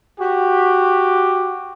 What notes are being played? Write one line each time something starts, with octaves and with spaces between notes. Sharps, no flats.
F#4 G4